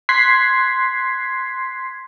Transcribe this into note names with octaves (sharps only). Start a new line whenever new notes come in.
C6 F#6 G#6 B6 C7